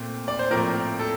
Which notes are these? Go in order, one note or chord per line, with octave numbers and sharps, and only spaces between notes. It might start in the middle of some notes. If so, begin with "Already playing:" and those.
Already playing: A#2 A3 C4
D5
C5
A2 F3 A#3 C4 A#4
A4